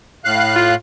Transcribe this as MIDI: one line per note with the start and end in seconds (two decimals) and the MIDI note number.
0.25 0.75 45
0.25 0.75 77
0.25 0.75 90
0.56 0.74 65